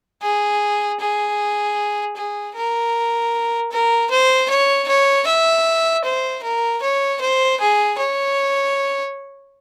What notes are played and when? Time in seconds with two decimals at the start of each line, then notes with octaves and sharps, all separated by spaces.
0.22 G#4
1.00 G#4
2.17 G#4
2.55 A#4
3.72 A#4
4.10 C5
4.50 C#5
4.88 C#5
5.27 E5
6.05 C5
6.44 A#4
6.82 C#5
7.21 C5
7.61 G#4
7.98 C#5